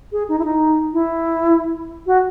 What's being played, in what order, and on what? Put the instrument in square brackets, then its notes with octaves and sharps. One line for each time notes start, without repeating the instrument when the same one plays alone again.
[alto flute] G#4
D#4
E4
D#4
E4
F#4